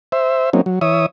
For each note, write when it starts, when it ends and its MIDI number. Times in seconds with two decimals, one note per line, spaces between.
0.12 0.50 72
0.12 0.50 76
0.53 0.61 54
0.53 0.61 58
0.53 0.61 60
0.53 0.61 61
0.53 0.61 63
0.66 0.79 54
0.81 1.06 52
0.81 1.06 73
0.81 1.06 76
0.81 1.06 87